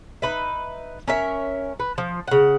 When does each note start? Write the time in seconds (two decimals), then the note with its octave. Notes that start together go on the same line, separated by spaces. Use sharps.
0.22 D#4 B4 E5
1.08 C#4 A#4 E5
1.80 B4
1.98 F3
2.27 C#3 F#5